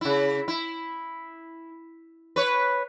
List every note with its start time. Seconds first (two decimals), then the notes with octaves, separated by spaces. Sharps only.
0.01 C#3 E4
0.48 E4
2.36 B4 C#5